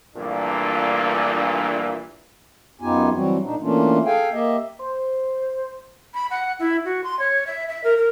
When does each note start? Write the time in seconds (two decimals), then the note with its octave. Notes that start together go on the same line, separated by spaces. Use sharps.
0.16 A#1 G2 A#2 E3 A3 D4
2.81 F#2 B3 D#4 F4 G4 G#5
3.14 E3 F#3 G3 C4 F#4
3.43 A#2 D4 D#4
3.61 E3 A3 A#3 C#4 D4 F4
4.05 G#4 A4 F5 G5 G#5
4.32 A#3 G4 D#5 E5
4.79 C5
6.14 B5
6.30 F#5
6.59 E4
6.85 F#4
7.04 C6
7.19 C#5
7.47 E5
7.69 E5
7.84 A#4
7.97 A#4